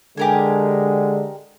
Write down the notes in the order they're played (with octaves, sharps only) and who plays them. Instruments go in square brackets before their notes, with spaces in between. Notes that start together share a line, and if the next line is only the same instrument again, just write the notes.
[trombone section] D3 G#3 [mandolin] G4 A#4 G#5